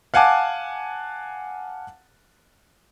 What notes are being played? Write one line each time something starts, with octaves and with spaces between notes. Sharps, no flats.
F5 F#5 G#5 A5 D6